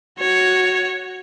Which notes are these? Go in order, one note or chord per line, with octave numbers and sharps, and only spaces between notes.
F#4 C#5